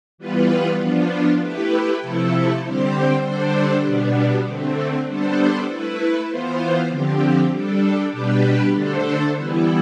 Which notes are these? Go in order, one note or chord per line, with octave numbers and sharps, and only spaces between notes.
E3 G3 B3 F4 B4
F3 B3 D4 F4
A3 E4 G4 B4
C3 F3 A3 E4 A4
D3 G3 C4 G4 C5
D3 G3 D4 A4 C5
B2 G3 B3 D4
D3 A3 C4
G3 B3 D4 A4 C5
A3 E4 B4
E3 B3 F4 C5
D3 F3 C4 G4
G3 D4 A4
B2 G3 D4 G4 B4
D3 A3 D4 A4 C5
E3 G3 B3 E4